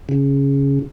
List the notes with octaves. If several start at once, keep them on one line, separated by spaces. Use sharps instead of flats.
C#3